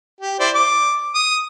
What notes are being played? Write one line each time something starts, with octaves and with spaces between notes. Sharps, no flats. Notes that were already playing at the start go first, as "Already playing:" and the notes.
G4
E4 C5 D5
D6
D#6